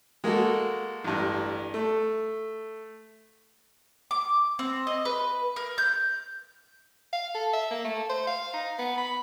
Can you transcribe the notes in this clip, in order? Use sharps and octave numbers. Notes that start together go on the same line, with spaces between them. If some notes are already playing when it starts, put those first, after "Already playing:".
G#3 A#3 F#4 A4
A1 G2
A3
D6
C4
D#5
B4
A#4
G6
F5
A4
E5
A#3
A3
C5
F5
D#4
B3
B5